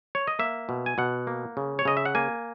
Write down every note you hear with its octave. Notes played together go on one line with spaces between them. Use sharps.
C#5
D#5
A#3 E5
B2
G#5
B2 F#5
A#3
C#3
C#5
C#3 D#5
E5
F#5
A#3 G#5